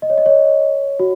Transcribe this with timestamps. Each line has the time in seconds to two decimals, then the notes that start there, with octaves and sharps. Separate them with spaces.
0.02 D#5
0.10 C#5
0.18 D#5
0.26 C#5
0.99 F#4